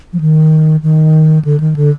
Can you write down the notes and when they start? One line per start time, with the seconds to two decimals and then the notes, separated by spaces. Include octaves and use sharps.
0.13 F3
0.20 D#3
0.83 D#3
1.45 D3
1.60 D#3
1.76 D3